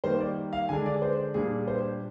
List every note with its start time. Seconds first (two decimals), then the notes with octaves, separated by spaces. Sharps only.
0.04 D#3 G3 A#3 C5
0.20 D5
0.53 F5
0.69 D3 G#3 D4 G#5
0.86 D5
1.02 C5
1.34 A#2 G3 D4 G#4
1.68 C5